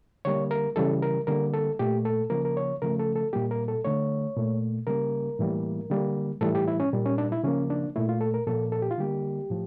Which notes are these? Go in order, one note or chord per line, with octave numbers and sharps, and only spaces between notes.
D3 G3 A#3 C#5
A#4
C#3 E3 G3 A4
A#4
D3 G3 A#3 A#4
A4
A#2 A3 G4
A4
C#3 F3 A#3 A#4
A#4
C#5
C#3 F3 A3 A#4
A4
A4
A#2 G3 A#3 G4
A#4
A4
D3 A3 C#5
A#2 A3
C#3 G3 A#3 A#4
A2 E3 G3 A#3
D3 G3 A#3
A2 E3 G3 A4
G4
E4
C#4
A#2 G3 A#3
C#4
D4
E4
C#3 F3 A#3 C#4
D4
A#2 A3 E4
F4
A4
A#4
A#2 F3 A#3 A4
A4
G4
F4
D3 G3 A#3 G4
A2 F3